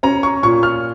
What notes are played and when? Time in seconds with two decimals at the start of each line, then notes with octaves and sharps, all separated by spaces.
0.03 C#4 A#5
0.23 C#6
0.43 A#2 C#6
0.63 F6